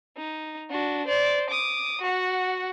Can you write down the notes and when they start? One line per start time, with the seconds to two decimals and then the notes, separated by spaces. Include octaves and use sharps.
0.17 D#4
0.70 D4 F#4
1.06 C5 D5
1.50 D6 D#6
2.01 F#4 F#5